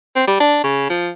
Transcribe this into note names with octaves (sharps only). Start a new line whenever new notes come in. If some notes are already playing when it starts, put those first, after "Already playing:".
C4
G3
D4
C#3
F3